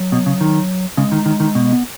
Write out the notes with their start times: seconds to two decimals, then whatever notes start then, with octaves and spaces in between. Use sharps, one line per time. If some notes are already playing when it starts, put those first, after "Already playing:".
Already playing: F#3
0.12 B2
0.26 C#3
0.41 D#3
0.97 C#3 G#3
1.12 D#3
1.26 D#3
1.40 D#3
1.55 B2
1.72 B3